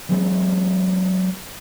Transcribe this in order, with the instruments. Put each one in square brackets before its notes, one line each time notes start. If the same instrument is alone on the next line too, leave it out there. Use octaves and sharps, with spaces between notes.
[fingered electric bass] E3 F#3 G#3 C4